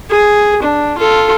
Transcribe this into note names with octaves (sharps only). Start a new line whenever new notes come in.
G#4
D4
F4 A4